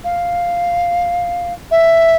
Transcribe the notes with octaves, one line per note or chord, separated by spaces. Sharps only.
F5
E5